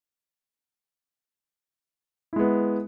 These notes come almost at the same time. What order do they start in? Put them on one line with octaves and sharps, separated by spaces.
E4 G#3 B3